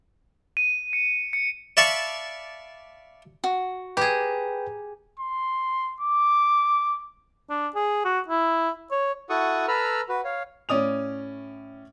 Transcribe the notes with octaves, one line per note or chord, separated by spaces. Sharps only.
D#7
C#7
C#7
D5 E5 F5 A5 B5 C#6
F#4
G4 G#4 B4 G5 A#5
C6
D6
D4
G#4
F#4
E4
C#5
E4 F#4 A4 F#5 C#6 D#6
A4 B4 A#5 B5 E6 F6
F#4 B4
C#5 F5
A2 C#4 D5 D#6 F7